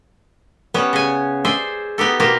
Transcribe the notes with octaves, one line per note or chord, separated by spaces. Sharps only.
G3 B3 C#4
C#3 G#5
G#4 C5 D5 E5 G#5
B3 D#4 G4 A4
B2 A#3 F4 G4 A#4